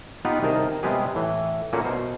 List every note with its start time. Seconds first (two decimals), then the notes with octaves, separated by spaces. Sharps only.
0.25 B3 D#4 F4 G4 B4 F#5
0.42 C2 D#3 G#4 A#4 D#5 A5
0.83 C3 G3 G#3 B3 G4 G#4
1.15 A2 E3
1.73 A#2 A3 A#3 C#4 F#4
1.84 B2 C5